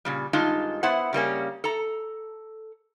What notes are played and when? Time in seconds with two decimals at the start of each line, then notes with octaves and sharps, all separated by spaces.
0.05 A#2 C#3 G3
0.33 G2 D#3 G#3 D#4 F4 A5
0.83 B3 E4 C5 F#5
1.13 C#3 G3 A#3 C#4
1.64 A4 A#5